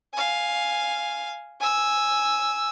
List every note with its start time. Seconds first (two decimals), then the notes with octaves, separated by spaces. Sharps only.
0.13 F5 G#5
1.60 G#5 E6